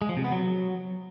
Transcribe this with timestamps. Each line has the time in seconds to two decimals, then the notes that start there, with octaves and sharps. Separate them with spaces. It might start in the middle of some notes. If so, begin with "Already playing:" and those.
0.02 G#3
0.09 F3
0.17 C3
0.24 B3
0.32 F#3